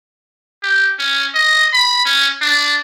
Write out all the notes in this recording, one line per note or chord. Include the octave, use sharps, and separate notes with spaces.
G4
C#4
D#5
B5
C#4
D4